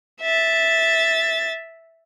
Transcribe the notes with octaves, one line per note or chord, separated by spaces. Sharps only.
E5 A6